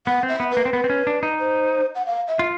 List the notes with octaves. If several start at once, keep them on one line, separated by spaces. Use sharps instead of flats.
B3 F#5
C4
E5
B3
B4
A#3
C4
B3 B4
C4
C#4
D4
D#4
C5
F#5
F5
E5
F4